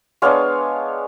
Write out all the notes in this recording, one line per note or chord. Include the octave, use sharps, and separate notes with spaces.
G#3 B3 D4 C#5 F5